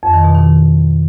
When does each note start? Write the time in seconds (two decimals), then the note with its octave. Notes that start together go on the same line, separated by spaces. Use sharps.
0.03 F2
0.14 D#3
0.24 B2
0.35 D#3